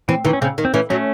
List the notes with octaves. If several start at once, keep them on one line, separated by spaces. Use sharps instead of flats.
E3 C4
D#3 E3
C#4
C#3 C4
D#3
C4
E3 A3 C#4
F#3 A3 C#4